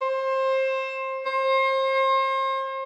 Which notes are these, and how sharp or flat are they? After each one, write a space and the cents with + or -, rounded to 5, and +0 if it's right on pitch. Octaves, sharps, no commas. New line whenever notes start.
C5 +25
C5 +35